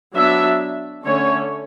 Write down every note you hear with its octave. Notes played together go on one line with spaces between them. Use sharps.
F#3 B3 D4 E5
D3 A3 C#4 C#5